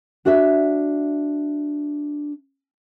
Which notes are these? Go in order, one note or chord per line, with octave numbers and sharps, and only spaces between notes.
D4 F#4 D5 E5